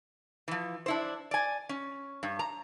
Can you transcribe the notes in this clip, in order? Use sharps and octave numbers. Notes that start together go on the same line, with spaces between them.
E3 F3
D4 E4 C5
D5 G#5
C#4
G2
A#5